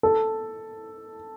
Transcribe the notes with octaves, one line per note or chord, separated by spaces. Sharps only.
A4